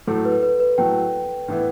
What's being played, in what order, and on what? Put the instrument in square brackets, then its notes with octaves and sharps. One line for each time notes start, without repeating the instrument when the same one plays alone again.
[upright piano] A2 F#3 A3 [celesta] A4
[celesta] B4
B4
B4
[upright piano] A2 F#3 A3 [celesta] G5
[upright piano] A2 E3 B3 E4 B4